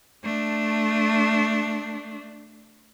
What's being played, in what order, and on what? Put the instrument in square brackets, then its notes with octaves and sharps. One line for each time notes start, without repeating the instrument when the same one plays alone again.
[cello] A3 D4